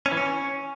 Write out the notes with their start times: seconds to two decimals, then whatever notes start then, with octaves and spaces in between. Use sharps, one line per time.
0.06 C#4
0.12 E3
0.17 C#4